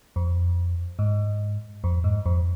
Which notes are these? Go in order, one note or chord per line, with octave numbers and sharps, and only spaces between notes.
F2
G#2
F2
G#2
F2